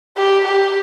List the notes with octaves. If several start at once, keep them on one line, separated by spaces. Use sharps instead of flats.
G4
G4